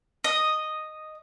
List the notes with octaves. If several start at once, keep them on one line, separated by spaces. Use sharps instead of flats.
D#5